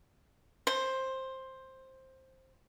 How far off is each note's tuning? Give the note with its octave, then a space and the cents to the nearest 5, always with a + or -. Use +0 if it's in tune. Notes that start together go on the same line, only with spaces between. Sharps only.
C5 +10